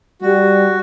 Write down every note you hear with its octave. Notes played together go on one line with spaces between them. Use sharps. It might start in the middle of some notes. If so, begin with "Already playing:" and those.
G3 F#4